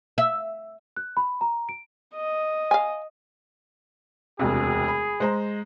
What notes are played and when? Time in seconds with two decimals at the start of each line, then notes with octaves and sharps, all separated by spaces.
0.18 E5
0.97 F#6
1.17 B5
1.41 A#5
1.69 D7
2.15 D#5
2.71 F5 G#5
4.39 E1 D2 C3 G#4
4.88 B5
5.20 G#3 C5 A#5